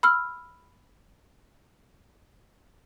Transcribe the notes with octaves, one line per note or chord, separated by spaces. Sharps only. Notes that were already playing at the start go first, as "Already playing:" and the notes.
B5 E6 F6